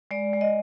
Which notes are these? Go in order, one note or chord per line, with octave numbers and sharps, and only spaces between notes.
G#3 D5
G#3
D#5